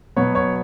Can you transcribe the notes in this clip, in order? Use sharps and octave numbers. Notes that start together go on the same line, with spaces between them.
B2 F#3 B3 C#5
C#5